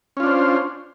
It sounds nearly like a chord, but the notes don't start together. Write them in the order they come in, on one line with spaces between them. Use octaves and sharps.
C#4 F4 D4 C5